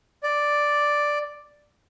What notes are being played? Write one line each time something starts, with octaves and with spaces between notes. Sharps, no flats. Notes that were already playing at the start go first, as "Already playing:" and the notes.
D5